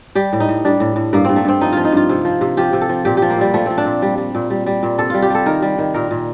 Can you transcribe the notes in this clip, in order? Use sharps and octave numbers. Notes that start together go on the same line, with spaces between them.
G3 G4
A2
D#4
A2
G3 D4
A2
A2
G2 A#3
G2 C4
A3
G2 C4
F3 D#4
F3 F4
D#4
G2 F4
C3
F3
C3
F3 G4
C3
A4
F3
A#2 G4
G4
F3
A#3
A#2 G3
F3 A3
F3 C4
D4
A#2
G3
G3
A#2
G3
G3
A#2
C3 A4
G3 F4
G4
G3 A4
D#3 A#4
G3
D#3
A#2 A#4
A#2